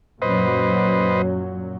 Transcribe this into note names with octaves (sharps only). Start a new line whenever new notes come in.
F#2 A#2 F#3 B4 C5 D#5